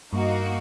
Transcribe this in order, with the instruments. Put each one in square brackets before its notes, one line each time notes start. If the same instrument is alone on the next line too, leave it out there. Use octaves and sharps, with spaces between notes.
[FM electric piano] G2 [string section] A#3 D#4 F#4